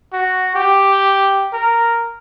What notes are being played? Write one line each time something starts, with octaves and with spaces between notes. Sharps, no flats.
F#4
G4
A#4